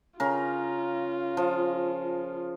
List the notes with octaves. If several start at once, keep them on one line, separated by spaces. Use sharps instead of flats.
C#3 F4 A#4
F3